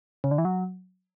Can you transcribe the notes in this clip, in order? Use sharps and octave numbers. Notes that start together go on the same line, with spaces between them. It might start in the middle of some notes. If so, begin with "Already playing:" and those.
C#3
D3
E3
F#3